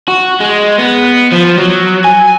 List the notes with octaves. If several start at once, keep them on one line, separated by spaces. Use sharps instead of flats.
F#4
G#3
B3
F3
F#3
G#5